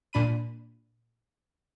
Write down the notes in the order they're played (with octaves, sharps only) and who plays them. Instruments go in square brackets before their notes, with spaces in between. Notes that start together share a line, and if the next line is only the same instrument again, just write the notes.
[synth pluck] A#2 D4 B5 D#7